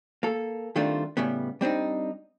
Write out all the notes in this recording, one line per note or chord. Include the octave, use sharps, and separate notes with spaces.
A#3 A4
D#3 G3 A3 C4 D4 F4
A2 C#3 G3 B3
G3 C4 D4 D#4